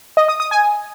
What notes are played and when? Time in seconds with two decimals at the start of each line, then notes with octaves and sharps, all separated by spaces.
0.17 D#5
0.28 D#6
0.40 D#6
0.51 G#5